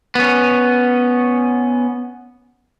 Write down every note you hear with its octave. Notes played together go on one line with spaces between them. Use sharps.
B3 C#4